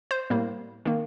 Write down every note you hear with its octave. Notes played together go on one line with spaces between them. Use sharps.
C5
A2 G3 A#3
D#3 A#3